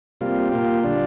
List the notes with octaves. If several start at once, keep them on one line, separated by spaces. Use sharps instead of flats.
C3 G3 A#3 F4
A#2 A#3 F4 G4
D3 G3 D4 F4